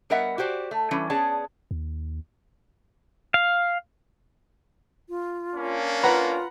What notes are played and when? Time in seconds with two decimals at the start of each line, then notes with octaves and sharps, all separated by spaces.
0.10 G3 B3 A#4 D#5 E5 F#5
0.38 F#4 G4 C5 D5
0.71 A3
0.91 E3 G3 C#4
1.10 B3 C#4 G#4 D5 A5
1.71 D#2
3.34 F5
5.09 F4
5.55 A#3 C#4 D4
6.03 F4 B4 F#5 A#5 B5